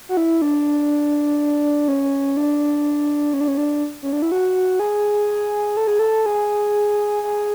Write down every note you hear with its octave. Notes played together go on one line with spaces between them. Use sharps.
F#4
E4
D4
C#4
D4
C#4
D4
C#4
D4
C#4
D4
E4
F#4
G#4
A4
G#4
A4
G#4
G#4